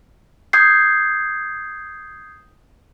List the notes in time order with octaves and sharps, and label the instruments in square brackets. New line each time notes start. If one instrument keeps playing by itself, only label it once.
[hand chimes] D#6 G6 G#6 C7